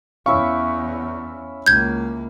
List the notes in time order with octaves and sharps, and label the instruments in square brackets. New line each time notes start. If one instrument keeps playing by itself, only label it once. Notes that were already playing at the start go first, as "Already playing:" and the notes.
[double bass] E2 [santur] C#4 E4 E5 [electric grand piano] F5 C#6
[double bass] C#2 A#3 [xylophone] G6 G#6